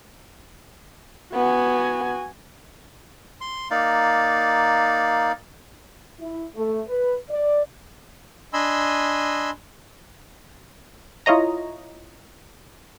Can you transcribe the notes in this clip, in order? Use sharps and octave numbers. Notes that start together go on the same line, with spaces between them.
B3 F#4 G#5
C6
A#3 D#4 D5 F5
E4
A3
B4
D5
D4 D#5 G#5 B5 C6 E6
E4 F4 C#5 D#5 A#5